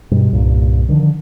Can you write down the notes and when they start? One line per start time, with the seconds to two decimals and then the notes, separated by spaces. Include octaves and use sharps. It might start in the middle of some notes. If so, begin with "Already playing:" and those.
0.11 G2 B2 G3
0.32 C2 G2 A#2
0.89 D3 D#3 F3